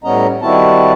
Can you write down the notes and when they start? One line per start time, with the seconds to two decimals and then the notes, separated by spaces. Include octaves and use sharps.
0.04 A2 G3 B3 C#4 D#5 A#5
0.42 D#3 G3 C4 E4 F#4 A5